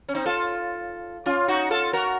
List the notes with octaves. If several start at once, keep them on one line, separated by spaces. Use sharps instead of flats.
C#4
C4 D#4
F4 A4
C#4 F4
D#4 F#4
F4 A4
F#4 A#4